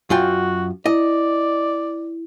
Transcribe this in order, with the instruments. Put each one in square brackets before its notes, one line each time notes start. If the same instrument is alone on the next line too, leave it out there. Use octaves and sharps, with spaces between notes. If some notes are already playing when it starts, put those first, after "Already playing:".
[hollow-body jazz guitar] F#2 F4 G5 [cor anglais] F#4
[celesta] E4 [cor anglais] D5 [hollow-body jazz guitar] D#5